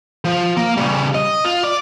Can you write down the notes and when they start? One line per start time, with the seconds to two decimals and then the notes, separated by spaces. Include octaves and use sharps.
0.25 F3
0.57 A#3
0.77 C#3 G3
1.15 D#5
1.45 F4
1.63 D5